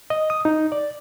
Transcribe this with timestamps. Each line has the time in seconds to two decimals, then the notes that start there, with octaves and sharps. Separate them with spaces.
0.10 D#5
0.30 D#6
0.45 D#4
0.72 D5